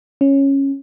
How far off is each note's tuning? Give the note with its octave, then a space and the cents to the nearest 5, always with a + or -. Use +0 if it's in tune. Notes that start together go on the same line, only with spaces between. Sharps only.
C#4 -10